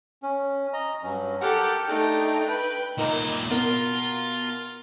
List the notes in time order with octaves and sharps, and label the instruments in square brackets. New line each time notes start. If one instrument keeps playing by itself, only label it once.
[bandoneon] C#4
D#5 A#5
G2 F#3 C#4
[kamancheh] G4 A4 [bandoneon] A#4 F#5
[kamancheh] A3 D#4 [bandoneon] D4 G5
[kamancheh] B4 [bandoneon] G5 G6
[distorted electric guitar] A#2 E4 [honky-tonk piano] D#4 A#4 A#5
[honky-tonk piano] B2 A#4 [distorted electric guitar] F4